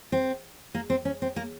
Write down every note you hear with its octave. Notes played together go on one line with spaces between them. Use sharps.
C4
A#3
C4
C#4
C4
A#3